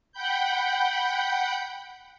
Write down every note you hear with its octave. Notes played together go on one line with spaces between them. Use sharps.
F#5 G5 B5 G6